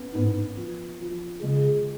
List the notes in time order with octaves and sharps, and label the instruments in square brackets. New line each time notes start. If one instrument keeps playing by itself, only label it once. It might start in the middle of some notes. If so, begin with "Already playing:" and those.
Already playing: [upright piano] B3 C#4
[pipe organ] G#2 [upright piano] B3
[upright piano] F3
F3
[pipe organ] C#3 [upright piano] G#3